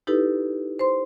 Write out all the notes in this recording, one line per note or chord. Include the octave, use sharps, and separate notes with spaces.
D#4 E4 G4 A4 B4
C5 C6